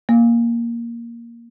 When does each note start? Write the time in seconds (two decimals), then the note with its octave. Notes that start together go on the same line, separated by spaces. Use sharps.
0.09 A#3